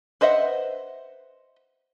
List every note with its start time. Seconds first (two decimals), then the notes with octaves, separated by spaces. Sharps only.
0.21 B4 C5 D#5 E5 F#5